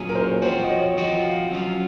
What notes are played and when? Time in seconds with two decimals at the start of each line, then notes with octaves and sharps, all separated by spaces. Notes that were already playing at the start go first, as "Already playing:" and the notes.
Already playing: A#2 F#3 C#4 G#4
0.09 A#4
0.15 C5
0.31 C#5
0.42 F3 C4 F#4 C5
0.63 D#5
0.70 C#5
0.97 F3 C4 F#4 D#5
1.24 F5
1.51 F#3 C#4 F4 F5